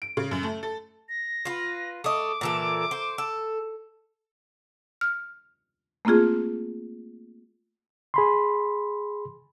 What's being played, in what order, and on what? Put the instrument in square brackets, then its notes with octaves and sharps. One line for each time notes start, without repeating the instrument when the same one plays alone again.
[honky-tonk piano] D7
C#3
F#2
A3
A4
[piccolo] A#6
[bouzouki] F4 B4
[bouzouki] A3 D#5 [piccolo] D6
[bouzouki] A#2 E3 A4
C5
A4
[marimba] F6
A3 A#3 C4 F4 G#4
[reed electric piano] G#4 B5 C6